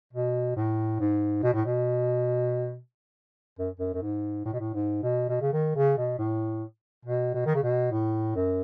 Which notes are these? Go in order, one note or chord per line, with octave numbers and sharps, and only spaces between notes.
B2
A2
G#2
B2
A2
B2
F#2
F#2
F#2
G#2
A2
B2
A2
G#2
B2
B2
C#3
D#3
C#3
B2
A2
B2
B2
D#3
C#3
B2
A2
F#2